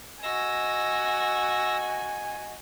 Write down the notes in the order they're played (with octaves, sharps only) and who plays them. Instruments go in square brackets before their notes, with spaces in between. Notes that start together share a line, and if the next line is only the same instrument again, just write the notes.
[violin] F#4 [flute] D#5 [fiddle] G#5 [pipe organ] E6 A#6